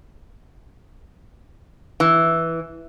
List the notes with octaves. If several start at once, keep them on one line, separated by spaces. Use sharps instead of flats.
E3